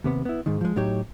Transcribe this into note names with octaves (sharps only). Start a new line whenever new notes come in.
D#2 C3 B3
B3 E4
G#2 D#3
F3 G#3
A2 F#3 D#4 G4 C#5